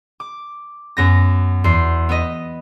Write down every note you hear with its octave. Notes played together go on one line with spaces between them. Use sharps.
D6
F#2 B3 A#6
E2 C6 C7
B3 B4 D#5